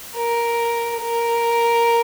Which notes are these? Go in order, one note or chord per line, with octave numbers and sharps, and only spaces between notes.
A#4
A#4